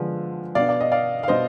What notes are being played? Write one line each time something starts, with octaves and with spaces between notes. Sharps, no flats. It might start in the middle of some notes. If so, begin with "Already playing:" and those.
Already playing: D3 F3 G#3 B3 D4
B2 B3 D4 D5 F5
D5
D#5
D5 F5
F5
B2 B3 D4 C5 D#5